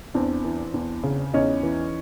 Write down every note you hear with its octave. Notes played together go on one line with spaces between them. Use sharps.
E2 C4 D4
E3
E2
C#3
E2 C#4 D#4
E3